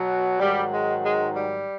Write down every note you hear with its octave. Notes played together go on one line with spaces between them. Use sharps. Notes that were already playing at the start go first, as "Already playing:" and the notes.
Already playing: B2 F#3
G#2 D#3 F#3 G3
G#3
G#3
G3